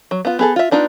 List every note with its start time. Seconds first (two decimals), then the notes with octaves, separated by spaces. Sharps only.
0.11 F#3
0.25 B3 F4
0.39 B3 G#4 A4
0.56 F4 E5
0.71 B3 D4 D#4 F4